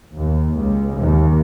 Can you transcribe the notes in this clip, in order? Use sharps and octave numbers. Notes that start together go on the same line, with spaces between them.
D#2
C#2
D#2